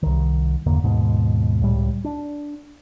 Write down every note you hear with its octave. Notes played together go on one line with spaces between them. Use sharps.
C2 D#3
G1 E2 D3 A#3
D#2 G#2 B2
C#2 A2 G3
D4